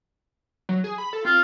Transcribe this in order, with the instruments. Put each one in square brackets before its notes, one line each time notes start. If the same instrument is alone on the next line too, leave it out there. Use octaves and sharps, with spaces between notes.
[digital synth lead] F#3
G#4
B5
A4
[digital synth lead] C4 [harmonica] F4